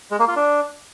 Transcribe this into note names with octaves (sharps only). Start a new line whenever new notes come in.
G#3
A#3
F4
D4